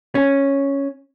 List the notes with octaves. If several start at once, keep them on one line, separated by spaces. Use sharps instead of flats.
C#4